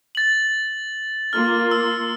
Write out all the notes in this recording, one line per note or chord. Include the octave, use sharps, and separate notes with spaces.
A6 F#7
A#3 F4 F6
E6